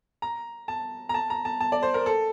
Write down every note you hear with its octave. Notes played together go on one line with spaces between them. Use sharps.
A#5
A5
A#5
A5
A#5
A5
A5
D5
C5
A#4
A4